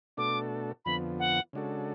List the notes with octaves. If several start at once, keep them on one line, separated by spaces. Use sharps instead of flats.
B2 A3 D4 F#4 A4 D6
F2 D3 F3 B3 B5
F#5
C#3 G#3 D4 F#4 A4